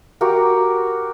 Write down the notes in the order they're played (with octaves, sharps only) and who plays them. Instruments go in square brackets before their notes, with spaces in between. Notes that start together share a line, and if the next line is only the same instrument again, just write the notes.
[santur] F#4 G4 A#4